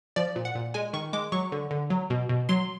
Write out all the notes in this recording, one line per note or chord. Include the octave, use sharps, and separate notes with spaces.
F3 D5
A#2
F#5
A#2
G#3 G#5
D#3 C#6
G#3 D6
F#3 C#6
D3
D3
F#3
B2
B2
F#3 C6